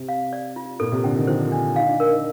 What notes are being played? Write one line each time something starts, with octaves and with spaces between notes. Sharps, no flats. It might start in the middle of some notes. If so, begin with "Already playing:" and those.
Already playing: C3
F5
D5
F4
A#2 A4
C3
D3 G5
D#3
F3 C5
D4
D#4 F5
D4
D4 A#4
D#4